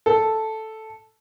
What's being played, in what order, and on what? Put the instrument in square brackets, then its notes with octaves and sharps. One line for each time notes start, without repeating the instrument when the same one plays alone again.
[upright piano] A4